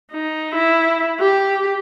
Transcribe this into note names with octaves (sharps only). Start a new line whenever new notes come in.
D#4
E4
G4